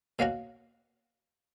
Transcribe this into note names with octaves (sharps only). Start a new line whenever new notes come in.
B2 A#3 C#4 F#4